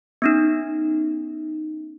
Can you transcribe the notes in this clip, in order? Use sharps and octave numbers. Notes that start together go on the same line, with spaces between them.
B3 C#4 D#4